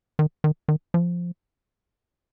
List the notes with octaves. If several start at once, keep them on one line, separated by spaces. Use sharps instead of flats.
D#3
D#3
D#3
F3